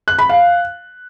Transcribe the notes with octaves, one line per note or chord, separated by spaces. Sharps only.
F#6
B5
F5